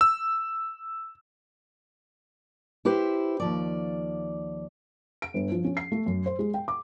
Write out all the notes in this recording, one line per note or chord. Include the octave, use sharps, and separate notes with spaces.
E6
E4 G4 B4 C5
D#2 F3 D5
D7
G1
F3
C#4
C7
A3
F#2
C5
G#3
G5
D6